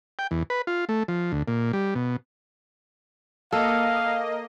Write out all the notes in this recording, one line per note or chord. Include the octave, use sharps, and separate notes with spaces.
G5
E2
B4
F4
A3
F3
D2
A#2
G3
B2
A#3 A4 D#5 F5